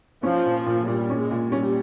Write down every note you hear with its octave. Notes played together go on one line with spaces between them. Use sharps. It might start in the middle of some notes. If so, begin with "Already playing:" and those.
F3 C#4
A#2
A#2
A#2 G3
C#4
G#3
A#2
G3 C#4